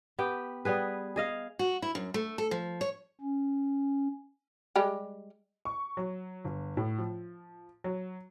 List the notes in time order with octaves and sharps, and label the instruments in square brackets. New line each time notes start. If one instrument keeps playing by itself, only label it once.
[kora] B3 G4 G5
G3 B3 G#4 B4
G#4 D#5 F5
[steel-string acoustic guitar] F#4
E4
F#2
A3
A4
F3
C#5
[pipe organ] C#4
[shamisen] G3 G#3 G4
[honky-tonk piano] C#6
F#3
G1
A2
F3
F#3